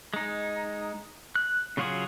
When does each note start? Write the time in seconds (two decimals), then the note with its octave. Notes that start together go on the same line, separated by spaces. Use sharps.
0.14 G#3 D#4
1.35 F#6
1.77 C#3 F#3 F4 F#4 G#4